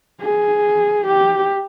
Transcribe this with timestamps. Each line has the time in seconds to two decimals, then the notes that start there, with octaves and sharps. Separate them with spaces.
0.22 G#4
1.07 G4